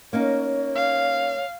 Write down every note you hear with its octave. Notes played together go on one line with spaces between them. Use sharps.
A#3 C#4 D#4 C#5
F5